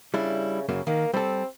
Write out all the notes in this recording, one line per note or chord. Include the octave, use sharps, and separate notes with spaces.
C#3 G3 D4 E4
F#2 C#3 F#3 A#3
D#3 A#3
G3 C4 A4